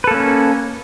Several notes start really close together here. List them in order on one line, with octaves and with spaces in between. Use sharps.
B4 A4 A#3 C#4